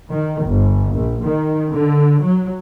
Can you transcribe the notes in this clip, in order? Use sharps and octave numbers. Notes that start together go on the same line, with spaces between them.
D#3
G1
A#1
D#3
D3
F#3